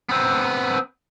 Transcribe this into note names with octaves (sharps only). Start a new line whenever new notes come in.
B3 C4